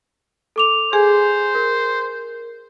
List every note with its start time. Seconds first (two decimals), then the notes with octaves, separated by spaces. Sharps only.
0.56 A4 D6 F7
0.93 G#4 C5 G#5
1.55 A#4